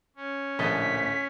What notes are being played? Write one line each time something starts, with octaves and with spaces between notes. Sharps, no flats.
C#4
D1 A#1 A3 D#5 A5 B6